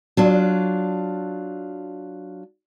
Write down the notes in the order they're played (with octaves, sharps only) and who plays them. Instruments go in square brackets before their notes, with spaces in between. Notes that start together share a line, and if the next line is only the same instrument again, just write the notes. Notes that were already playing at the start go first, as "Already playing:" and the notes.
[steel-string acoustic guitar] F#3 D4 F4